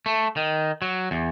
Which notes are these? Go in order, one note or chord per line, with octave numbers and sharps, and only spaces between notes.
A3
D#3
F#3
E2